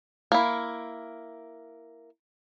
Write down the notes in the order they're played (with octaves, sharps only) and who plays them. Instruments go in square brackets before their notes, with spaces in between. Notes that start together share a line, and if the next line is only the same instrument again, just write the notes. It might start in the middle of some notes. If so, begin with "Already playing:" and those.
[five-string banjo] A#3 E4